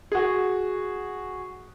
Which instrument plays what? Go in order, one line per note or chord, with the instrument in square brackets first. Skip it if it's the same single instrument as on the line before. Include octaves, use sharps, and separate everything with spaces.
[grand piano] F#4 G#4